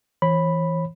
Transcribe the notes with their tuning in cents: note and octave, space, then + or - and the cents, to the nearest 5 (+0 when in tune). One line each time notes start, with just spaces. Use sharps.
E3 +0 C#5 -35 B5 +0